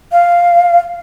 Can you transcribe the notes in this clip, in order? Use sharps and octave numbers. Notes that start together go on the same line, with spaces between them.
F5